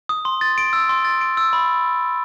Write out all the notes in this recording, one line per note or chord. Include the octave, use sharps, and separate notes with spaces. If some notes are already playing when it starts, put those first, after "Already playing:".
D#6
C6
A6
D7
E6
C6
A6
D7
E6
B5